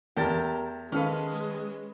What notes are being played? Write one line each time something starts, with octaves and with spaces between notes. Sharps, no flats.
E2 G4 A#4 A5 A6
D#3 G#3 C#4 A4 B4 F5